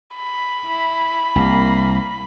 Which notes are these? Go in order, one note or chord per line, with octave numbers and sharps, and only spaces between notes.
B5
E4
C2 A#3